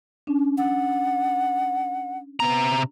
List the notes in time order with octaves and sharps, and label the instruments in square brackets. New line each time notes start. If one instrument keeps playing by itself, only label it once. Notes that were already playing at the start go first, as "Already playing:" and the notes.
[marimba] C#4 D4
[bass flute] F#5
[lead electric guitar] C3 A#5 [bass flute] B3